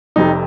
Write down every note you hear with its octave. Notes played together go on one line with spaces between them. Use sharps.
F1 F2 C3 D#4